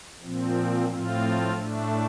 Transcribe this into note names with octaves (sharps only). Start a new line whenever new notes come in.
A#2 F3 C4
A2 F3 C4 F4
A2 A3 D4